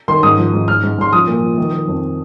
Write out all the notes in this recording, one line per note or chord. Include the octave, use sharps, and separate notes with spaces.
D#3 C6
G#2 D#6
F3
G#2
G#2 F6
G#2
G#2 C6
F3 D#6
A#2
F3
D#3
D#3
F2